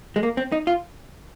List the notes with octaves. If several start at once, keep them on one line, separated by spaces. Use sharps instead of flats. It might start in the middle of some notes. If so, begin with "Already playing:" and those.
G#3
A#3
C4
D#4
F4